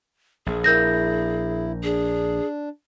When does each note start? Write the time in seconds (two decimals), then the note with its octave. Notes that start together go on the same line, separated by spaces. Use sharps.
0.46 A#1 G#4
0.64 E4 A#4 G6 A#6
1.83 D4 G#4